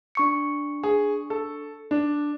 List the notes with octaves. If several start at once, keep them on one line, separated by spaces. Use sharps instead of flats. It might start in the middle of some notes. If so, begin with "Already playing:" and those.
D4 C#6 C#7
G#4
A4
D4